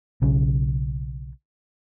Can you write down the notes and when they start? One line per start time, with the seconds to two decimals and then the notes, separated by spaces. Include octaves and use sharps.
0.22 B1 C#3